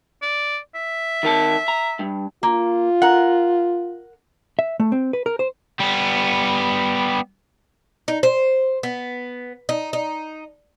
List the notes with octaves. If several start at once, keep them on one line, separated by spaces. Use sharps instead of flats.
D5
E5
D#3 A#4 A5
A#5
G2
A#3 F4
A#4 F#5
E5
A3
C4
B4
A#4
C5
G3 B3
D#4
C5
B3
D#4
D#4